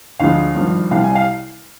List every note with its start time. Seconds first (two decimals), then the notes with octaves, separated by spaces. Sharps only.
0.19 D2 D3 F3 G#3 F5
0.55 G#1 G2 F3
0.91 C2 C3 G3 F5
1.04 G#5
1.15 F5